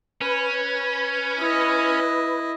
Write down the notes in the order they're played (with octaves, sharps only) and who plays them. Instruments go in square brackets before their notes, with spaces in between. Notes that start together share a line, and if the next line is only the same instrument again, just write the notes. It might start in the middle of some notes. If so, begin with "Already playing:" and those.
[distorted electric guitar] C#4 [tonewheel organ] B4
[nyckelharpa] E4 D#5